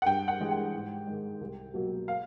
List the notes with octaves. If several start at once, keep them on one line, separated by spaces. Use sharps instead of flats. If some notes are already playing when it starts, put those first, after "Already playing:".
F#5
G2 G5
F#5
E3 G#3
G5
G#2
D#3 G#3
C2
B2 F#3 A#3
F5